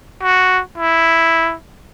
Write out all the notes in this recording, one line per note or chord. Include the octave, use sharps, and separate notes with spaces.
F#4
E4